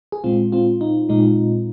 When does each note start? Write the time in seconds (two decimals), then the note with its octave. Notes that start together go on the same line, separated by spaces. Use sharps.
0.12 G#4
0.24 A#2 G#3 C4 F4
0.52 C4 F4
0.81 D#4
1.09 A#2 G#3 D#4